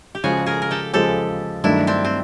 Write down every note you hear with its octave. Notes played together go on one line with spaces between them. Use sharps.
G4
C#3 F3 G#3 F#4 G#4
G#4 A#4
A#4
G4 A4
C#3 F3 G#3 G4 A4
G2 D#3 F#3 A3 D4 E4
C4 D4
C4